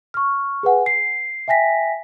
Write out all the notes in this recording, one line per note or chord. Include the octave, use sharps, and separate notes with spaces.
C#6 F6
G#4 B4 F#5 G#5
C7
E5 G5 G#5 A#6 B6